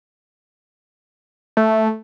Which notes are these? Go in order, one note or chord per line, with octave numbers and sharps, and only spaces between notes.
A3